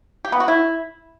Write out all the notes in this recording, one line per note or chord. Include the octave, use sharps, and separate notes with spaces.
G4
B3
F#4
E4